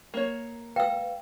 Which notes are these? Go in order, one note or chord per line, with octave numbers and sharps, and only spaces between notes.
A#3 C#5
B4 F5 G5 E6